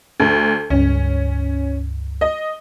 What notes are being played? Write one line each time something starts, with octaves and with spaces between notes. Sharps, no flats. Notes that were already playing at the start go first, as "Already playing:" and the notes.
D2
C#2 G2 C#4
D#5